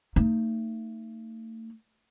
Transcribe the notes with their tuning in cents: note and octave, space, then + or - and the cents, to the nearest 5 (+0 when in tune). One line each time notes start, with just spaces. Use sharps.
A3 +35 D#4 +0